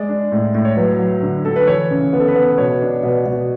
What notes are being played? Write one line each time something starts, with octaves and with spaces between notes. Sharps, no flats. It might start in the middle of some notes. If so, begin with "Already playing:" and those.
Already playing: G#3 D5
D4
A2
A2
C#5
F#3 B4
F#3
D3
D3 A4
B4
E3 C#5
C#3
B3
A4
B4
B3
B2 C#5
D4
B2 B4
B2